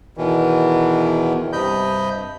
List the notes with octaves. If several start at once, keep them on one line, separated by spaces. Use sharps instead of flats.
E2 B2 D#3 E3
G2 C3 D#5 B5 G6